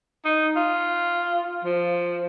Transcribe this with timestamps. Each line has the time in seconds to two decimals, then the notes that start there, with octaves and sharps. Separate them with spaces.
0.25 D#4
0.56 F4
1.64 F3